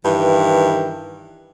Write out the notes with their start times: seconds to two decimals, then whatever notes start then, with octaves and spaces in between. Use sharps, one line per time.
0.04 G2 D#3 E3